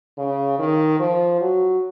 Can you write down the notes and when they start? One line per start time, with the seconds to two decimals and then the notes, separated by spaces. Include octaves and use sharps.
0.18 C#3
0.59 D#3
1.00 F3
1.41 F#3